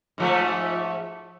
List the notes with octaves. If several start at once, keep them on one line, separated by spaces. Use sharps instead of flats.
G#2 F3 A3